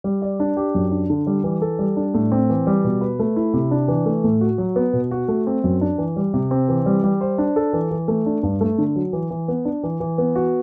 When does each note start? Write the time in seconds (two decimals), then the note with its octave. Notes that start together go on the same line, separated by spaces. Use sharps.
0.04 G3
0.22 D5
0.40 D4
0.57 G4
0.75 F#2
0.91 D4
1.10 D3
1.27 G3
1.44 E3
1.62 A4
1.79 G3
1.97 D4
2.14 A2
2.32 C4
2.50 E3
2.67 G3
2.84 B2
3.01 B4
3.19 A3
3.36 E4
3.53 C3
3.71 D4
3.88 E3
4.06 A3
4.24 A2
4.41 F#4
4.58 F#3
4.76 B3
4.93 B2
5.11 F#4
5.28 A3
5.47 C4
5.64 F#2
5.81 D4
5.98 E3
6.16 G3
6.34 C3
6.51 C4
6.69 E3
6.86 G3
7.04 G3
7.21 C5
7.38 D4
7.56 A4
7.73 E3
7.91 E3
8.08 A3
8.26 D4
8.43 G2
8.61 A3
8.78 D3
8.96 F#3
9.13 E3
9.30 E3
9.48 B3
9.65 D4
9.83 E3
10.00 E3
10.18 B3
10.35 F#4